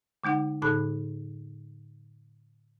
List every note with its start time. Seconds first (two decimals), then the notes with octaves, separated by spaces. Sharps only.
0.24 D3 G#3 D#4 F#5
0.62 A2 D3 D#4 A4 B5 F#6